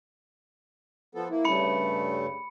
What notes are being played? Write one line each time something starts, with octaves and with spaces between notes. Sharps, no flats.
F3 B3 A4
A#3 E4
G2 C#3 A3 B5 C#7